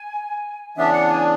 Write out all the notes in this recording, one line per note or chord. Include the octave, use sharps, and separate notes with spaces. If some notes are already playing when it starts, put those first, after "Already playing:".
Already playing: G#5
C#3 E3 B3 D4 E5
F#5
G#5